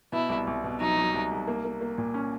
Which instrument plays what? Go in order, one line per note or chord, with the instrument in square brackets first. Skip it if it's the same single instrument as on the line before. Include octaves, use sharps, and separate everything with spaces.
[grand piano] B2 [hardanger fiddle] E4
[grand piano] C2
C2
B2
[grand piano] F#3 [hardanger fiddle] D#4
[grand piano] F#3
C2
C2
A#3
A#3
A#3
A#2
C#4